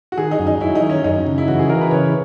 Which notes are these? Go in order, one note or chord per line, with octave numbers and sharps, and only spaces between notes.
F#4
D#3 G#4
D#4
F#2
D#4
F#3 E4
D#4
D#3
C#4
F#2 D#4
C#3
E4
E3 F#4
G#4
E3 A#4
B4
C#3 C#5